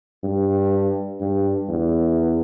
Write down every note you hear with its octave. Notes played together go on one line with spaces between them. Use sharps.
G2
G2
E2